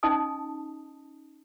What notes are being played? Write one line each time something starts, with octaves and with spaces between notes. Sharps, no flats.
C#4 D#4 D#5 G#5 A5 D#6